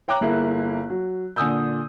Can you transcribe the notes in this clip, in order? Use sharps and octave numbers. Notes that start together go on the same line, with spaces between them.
C#5 G5 A#5 D6 F#6
G1 A#3 E4 G#4
F#3
A#2 D3 G#5 D#6 E6 G6